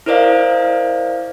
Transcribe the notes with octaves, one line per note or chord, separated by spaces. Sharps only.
E4 A#4 C5 D5 D#5 F5